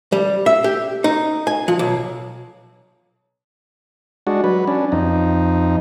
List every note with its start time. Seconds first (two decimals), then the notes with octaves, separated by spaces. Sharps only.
0.12 G3
0.46 E5
0.64 G4
1.04 D#4
1.47 G#5
1.68 F3
1.79 B1
4.27 G#3 D4 F#4
4.44 F#3 B4
4.68 C#4 D4
4.92 F2 D#4